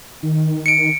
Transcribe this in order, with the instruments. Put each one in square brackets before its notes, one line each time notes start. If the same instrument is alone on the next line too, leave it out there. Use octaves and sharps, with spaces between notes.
[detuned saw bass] D#3
[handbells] C#7 D7